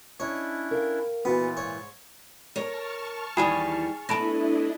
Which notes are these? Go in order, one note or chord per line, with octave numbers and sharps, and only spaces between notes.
C#4 D4 E4 C#5 D#5
A#4 F5 G5
A#2 E3 B3 F4 F#4
G#2 C#5
A#4 C#5 A5 C#6 F6
D#2 E3 G3 G#4 B5
A3 B3 D4 E4 D#5 A5 B5 A#6